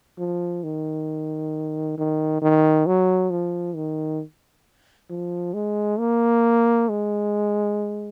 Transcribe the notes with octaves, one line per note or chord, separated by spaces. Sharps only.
F3
D#3
D#3
D#3
F#3
F3
D#3
F3
G#3
A#3
G#3